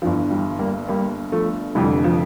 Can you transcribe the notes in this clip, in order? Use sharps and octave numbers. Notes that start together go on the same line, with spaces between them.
G1 G2 E3 F3
E3 G3
G3 A#3
G3 A#3
F3 A3
F1 F2 D3 E3 G3
F3